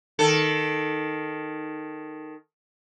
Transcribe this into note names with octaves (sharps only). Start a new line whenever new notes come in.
D#3 A4